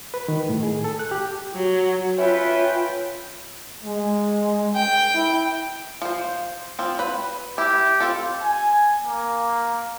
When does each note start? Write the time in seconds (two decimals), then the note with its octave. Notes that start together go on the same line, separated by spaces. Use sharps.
0.14 B4
0.28 D#3
0.49 A2
0.63 G#4
0.84 A4
0.99 F#6
1.11 G4
1.53 F#3
2.18 C#4 F4 B4 E5 G5
3.83 G#3
4.75 G5
5.14 E4
6.02 F3 C5
6.79 F3 C4
6.99 B4 B5
7.58 E4 G4
8.00 C4 F4 A4
8.42 G#5
9.04 A#3